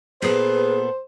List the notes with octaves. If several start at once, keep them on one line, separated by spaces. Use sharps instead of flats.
A#2 B3 G#4 A4 B4 C5